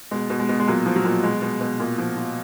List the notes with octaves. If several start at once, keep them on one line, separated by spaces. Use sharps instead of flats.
B2 G#3
B2
G#3
B2
G#3
A#2 F#3
F3
F#3
A#2
B2 G#3
B2
B2
A#2
F3
F3